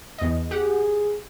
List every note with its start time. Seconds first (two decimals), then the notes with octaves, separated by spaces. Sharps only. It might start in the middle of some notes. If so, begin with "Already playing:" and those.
0.18 E2 D#5
0.51 G4 G#4 F#5